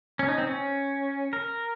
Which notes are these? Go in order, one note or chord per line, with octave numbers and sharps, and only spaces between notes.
C#4
D#4
C4
C#4
A#4